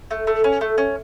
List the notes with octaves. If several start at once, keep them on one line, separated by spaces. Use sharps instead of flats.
A3
A3
C#4
A3
C#4